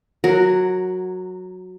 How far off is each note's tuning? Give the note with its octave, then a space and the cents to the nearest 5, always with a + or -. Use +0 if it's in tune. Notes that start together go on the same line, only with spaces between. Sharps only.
F#3 -10 A#4 +0 F#5 +0